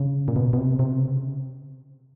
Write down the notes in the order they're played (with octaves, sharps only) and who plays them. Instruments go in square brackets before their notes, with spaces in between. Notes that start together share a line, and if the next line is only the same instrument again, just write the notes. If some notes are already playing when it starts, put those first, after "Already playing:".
Already playing: [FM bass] C#3
A#2
B2
B2
C3
C3
C#3